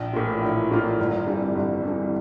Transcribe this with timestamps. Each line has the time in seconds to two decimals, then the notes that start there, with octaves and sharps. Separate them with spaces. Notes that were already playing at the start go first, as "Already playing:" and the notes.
Already playing: A#1
0.13 A2 E3 A#3 F4
0.42 A#1
0.71 A2 E3 A#3 F4
0.99 G1
1.26 F2 E3 G3
1.55 G1
1.83 F2 E3 G3